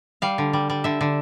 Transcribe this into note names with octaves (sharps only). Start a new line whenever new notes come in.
G3 F5
D3
G3
G3
D3 E5
D3